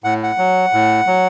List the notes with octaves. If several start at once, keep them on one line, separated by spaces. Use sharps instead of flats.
A2 F#5
F#5
F#3
A2
F#3